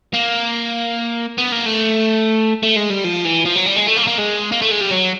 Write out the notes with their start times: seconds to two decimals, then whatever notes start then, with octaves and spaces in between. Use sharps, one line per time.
0.14 A#3
1.38 B3
1.52 A#3
1.66 A3
2.63 A3
2.76 G#3
2.90 G3
3.04 F3
3.25 E3
3.45 F3
3.56 F#3
3.66 G3
3.77 G#3
3.87 A3
3.97 A#3
4.04 A3
4.07 A#3
4.19 G#3
4.52 A#3
4.62 A3
4.71 G#3
4.81 G3
4.91 F#3